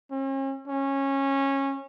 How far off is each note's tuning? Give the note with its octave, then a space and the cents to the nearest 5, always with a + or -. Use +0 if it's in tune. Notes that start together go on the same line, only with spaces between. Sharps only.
C#4 -40
C#4 -20